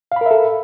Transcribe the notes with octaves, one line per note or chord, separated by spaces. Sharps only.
A4 A#4 E5 F5 B5